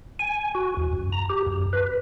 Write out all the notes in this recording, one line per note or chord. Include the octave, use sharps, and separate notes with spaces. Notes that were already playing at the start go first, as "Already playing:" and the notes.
G#5
F#4
E2
F#2
A#5
G4
F#2
B4